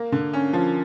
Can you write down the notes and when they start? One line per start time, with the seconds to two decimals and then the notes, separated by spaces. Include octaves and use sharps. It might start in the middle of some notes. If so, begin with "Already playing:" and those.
Already playing: A#3
0.12 D3
0.33 C#4
0.53 F3